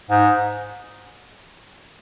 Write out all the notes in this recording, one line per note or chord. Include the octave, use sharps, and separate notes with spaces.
G#2